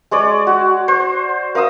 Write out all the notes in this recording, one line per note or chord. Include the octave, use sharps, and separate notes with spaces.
G#3 C#5 D5
F#4
C5
A#4 F5 D#6 E6